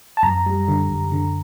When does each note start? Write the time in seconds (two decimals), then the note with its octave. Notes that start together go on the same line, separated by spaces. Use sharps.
0.17 A5
0.23 F#2 A#5
0.46 G3
0.68 D3
0.90 F#2
1.12 D3